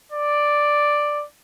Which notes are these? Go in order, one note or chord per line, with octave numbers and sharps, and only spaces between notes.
D5